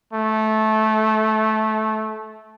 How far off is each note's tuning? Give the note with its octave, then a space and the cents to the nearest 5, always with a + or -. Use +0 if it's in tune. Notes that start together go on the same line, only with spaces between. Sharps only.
A3 -15